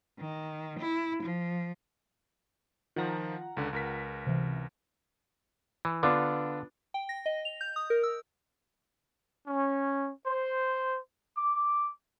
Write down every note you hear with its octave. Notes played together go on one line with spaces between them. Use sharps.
D#3
E4
F3
D#3 F3 F4 F#5 A#5
C#2 D3
C#2 A#4 B6
C3 E3
E3
D3 B3 D4 F4
G5
A#6
D#5
F7
G6
D#6
A#4
E6
C#4
C5
D6